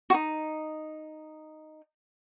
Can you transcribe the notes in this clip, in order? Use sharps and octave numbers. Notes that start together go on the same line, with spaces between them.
D#4 F#4